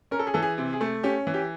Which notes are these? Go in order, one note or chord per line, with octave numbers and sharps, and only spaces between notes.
C#4 A#4
A4
G#4
E3 A4
G#4
C3
G#4
A3
C#4 G4
E3
G4